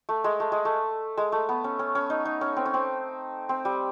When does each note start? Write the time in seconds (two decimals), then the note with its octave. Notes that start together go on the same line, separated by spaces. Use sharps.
0.09 A3
0.24 G#3
0.40 A3
0.52 G#3
0.65 A3
1.17 G#3
1.32 A3
1.49 B3
1.64 C#4
1.79 C#4
1.95 C#4
2.10 D#4
2.26 D#4
2.41 C#4
2.57 C4
2.66 C#4
2.74 C4
3.49 C4
3.65 G3